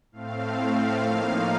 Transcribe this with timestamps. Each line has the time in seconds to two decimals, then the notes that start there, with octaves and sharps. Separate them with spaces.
0.12 A2 A3 C4 F5
0.57 F5
1.03 A2 F3 A#3 D#4